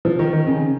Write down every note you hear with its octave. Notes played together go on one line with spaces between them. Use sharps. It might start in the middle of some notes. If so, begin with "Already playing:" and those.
F3
D#3
D#3
C#3